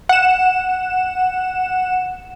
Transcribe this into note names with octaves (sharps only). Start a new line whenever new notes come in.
F#5 E7